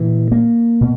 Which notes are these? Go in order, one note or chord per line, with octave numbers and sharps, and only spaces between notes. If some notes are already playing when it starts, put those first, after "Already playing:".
Already playing: A#2 E3
A#3
B2